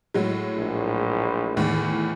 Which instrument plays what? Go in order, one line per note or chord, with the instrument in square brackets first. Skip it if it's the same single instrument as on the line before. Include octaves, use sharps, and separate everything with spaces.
[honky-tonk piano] A2 F#3 G#3
[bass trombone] A#1
[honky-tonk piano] E2 A2 D#3